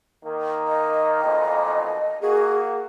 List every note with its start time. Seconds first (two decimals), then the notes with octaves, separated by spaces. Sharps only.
0.24 D#3 A#3
0.67 D#5
1.24 B1 F2 A#2
2.22 A#3 F#4 G#4